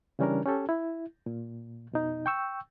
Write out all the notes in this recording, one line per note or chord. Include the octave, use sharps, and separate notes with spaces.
C#3 E3 G3 C#4 D4 A#4
C#4 G4 A4
E4
A#2
F2 B2 D#4
G5 C#6 E6